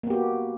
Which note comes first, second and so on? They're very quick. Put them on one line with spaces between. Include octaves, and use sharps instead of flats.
A#3 B3 G4 F#4